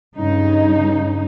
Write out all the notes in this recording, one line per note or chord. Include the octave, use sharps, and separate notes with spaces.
G2 C#3 D#4